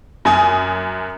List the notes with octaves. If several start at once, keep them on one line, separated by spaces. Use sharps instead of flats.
F#2 G#5 D#6